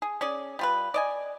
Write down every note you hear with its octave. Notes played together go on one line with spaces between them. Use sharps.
G#4
C#4 G#4 D5
G3 F4 B4
D5 D#5 G#5